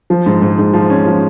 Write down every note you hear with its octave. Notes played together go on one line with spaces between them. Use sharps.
F3
G#2
G#2
G#2
F3
C#4
F3